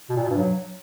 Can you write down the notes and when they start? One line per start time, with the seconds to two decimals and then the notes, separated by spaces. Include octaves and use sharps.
0.10 B2
0.17 A#2
0.23 B2
0.30 G2
0.37 F#3